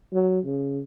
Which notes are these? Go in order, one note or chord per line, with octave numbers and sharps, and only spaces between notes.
F#3
C#3